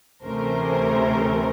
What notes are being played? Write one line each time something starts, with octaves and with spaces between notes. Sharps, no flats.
D2 C3 E3 A3 C#4 A#4 C5